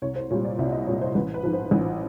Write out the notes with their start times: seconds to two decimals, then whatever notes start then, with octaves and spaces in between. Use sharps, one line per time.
0.02 C2 C#5
0.16 C5
0.30 A#2 G3 C#5
0.45 D5
0.59 C2 E5
0.72 D#5
0.87 A#2 G3 C#5
1.01 C5
1.15 A1 B4
1.34 B4
1.43 G#2 F3
1.53 C5
1.71 A1